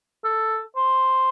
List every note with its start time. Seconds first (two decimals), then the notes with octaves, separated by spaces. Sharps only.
0.24 A4
0.76 C5